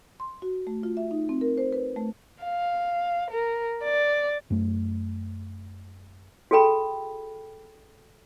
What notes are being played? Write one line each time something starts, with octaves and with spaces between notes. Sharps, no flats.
C6
F#4
A3
F4
E5
D#4
C4
A#4
C5
B4
A3
F5
A#4
D5
F#2 A3
F#4 G#4 A4 G5 B5